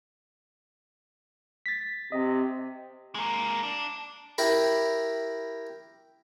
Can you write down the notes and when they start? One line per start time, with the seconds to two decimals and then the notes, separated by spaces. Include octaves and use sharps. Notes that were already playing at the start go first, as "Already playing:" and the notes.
1.66 A6 B6
2.12 C3 D#5
3.15 G#3 A#3
3.63 D4
4.38 E4 G4 A#4 B5